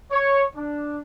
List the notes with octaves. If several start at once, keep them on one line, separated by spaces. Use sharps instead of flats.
C#5
D4